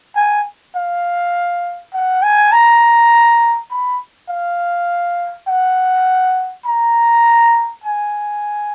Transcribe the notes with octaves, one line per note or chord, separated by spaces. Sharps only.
G#5
F5
F#5
G#5
A#5
B5
F5
F#5
A#5
G#5